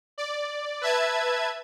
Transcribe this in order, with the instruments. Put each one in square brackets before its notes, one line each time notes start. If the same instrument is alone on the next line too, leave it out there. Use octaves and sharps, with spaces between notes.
[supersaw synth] D5
B4 E5 A5 G#6